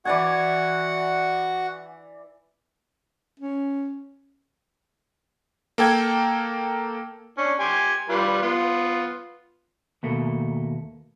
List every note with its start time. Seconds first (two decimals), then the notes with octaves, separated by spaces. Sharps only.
0.05 E3 F#4 D5 F#5 G#5
3.40 C#4
5.78 A#3 A4 G5 G#6
7.38 C#4 D4
7.60 G4 G#5 C6
8.09 G3 F4 B4
8.42 B3 F4
10.03 D#2 B2 A3 A#3